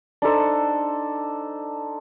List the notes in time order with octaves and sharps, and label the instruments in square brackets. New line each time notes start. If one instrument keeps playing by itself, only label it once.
[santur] D4 D#4 A4 C5